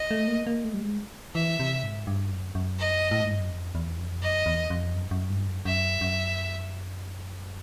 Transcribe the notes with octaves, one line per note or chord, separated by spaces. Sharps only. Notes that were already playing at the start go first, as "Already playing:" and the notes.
Already playing: D#5
A3
A#3
A#3
A3
G3
G#3
E3 E5
C3
G#2
G2
F#2
F#2
D#5
A2
G#2
G2
F#2
F2
E2
F2
F#2 D#5
E2
F2
F#2
F#2
G2
F#2
F#2 E5
F#2